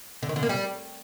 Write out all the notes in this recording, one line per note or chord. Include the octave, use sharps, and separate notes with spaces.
D3
D#3
D3
A#3
G3